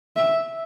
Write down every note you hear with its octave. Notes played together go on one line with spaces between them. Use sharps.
E5